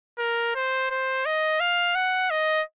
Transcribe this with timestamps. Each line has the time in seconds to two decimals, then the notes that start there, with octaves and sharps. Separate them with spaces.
0.19 A#4
0.55 C5
0.90 C5
1.26 D#5
1.60 F5
1.95 F#5
2.30 D#5